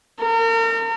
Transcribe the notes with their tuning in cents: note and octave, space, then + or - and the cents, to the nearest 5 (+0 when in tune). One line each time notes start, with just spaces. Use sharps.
A#4 -40